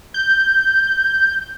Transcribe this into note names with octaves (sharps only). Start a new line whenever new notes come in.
G6